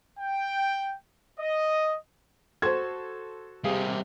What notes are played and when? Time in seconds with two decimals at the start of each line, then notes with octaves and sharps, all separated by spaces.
0.20 G5
1.40 D#5
2.62 F#4 A4 C5 C6 G#6
3.64 C3 G3 A#3 G#4 F5